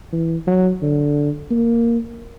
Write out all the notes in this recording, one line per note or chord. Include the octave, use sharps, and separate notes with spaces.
E3
F#3
D3
A#3